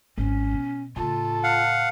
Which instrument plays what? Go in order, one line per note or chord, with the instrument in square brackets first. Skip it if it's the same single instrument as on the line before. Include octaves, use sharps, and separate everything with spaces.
[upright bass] G#1 [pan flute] C#4
[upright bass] B2
[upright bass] A2 C#3 [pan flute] F4 [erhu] A4
[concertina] F5 F#5